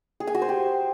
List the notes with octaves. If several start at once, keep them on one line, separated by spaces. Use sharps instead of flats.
G#4
G#5
F#4
C5
G4